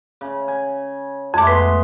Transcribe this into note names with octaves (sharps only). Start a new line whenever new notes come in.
C#3
G#5
F2 G#3 A3 D6
B3 B4 C6